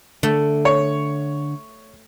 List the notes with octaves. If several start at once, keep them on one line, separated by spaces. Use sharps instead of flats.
D3 A3
C#5